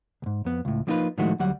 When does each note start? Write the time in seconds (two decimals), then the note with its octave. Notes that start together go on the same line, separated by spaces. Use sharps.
0.22 C#2 G#2
0.45 F2 B3
0.65 C#2 A2
0.87 F3 A#3 B3 D#4 F4 B4
1.18 A2 D#3 F3 G#3 A3 F#4
1.39 D2 F#3 G3 F#5